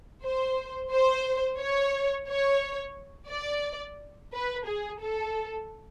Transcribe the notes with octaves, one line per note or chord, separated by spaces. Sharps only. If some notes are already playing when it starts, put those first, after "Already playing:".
C5
C5
C#5
C#5
D5
B4
G#4
A4